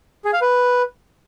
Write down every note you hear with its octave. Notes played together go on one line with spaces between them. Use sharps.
G#4
F5
B4